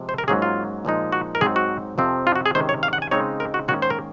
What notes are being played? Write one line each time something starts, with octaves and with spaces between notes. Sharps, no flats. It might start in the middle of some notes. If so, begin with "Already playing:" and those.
Already playing: C3 F3 G#3
C5
A#4
G#2 F#3 A#3 C#4 G#4
F4
A#2 F3 G#3 D#4
F#4
A#4
G#2 F#3 C4 D#4 G#4
F#4
F2 C3 F3 C4
F4
F#4
G#4
C3 D#3 G#3 C#4 C5
C#5
F5
F#5
G#5
C#3 G#3 C4 D#4 C#5
A#4
F#4
G#2 D#3 A#3 C#4 F#4
C5
A#4